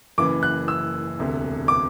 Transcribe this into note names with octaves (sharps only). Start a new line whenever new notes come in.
F#1 F#2 E3 D6
F#6
E6
E1 D2 C3
D6